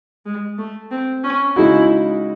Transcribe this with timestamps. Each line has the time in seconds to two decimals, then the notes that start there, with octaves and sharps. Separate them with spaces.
0.26 G#3
0.58 A3
0.91 C4
1.24 C#4
1.56 C#3 G#3 D#4 E4 F#4